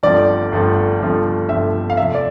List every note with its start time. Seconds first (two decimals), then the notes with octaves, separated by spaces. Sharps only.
0.03 G1 G2 F3 A3 C4 D5
0.52 G1 G2 F3 A3 C4
1.00 G1 G2 F3 A3 C4
1.49 G1 G2 F3 A3 C4 E5
1.90 F5
1.97 F2 C3 F3 A3 C4 E5
2.14 D5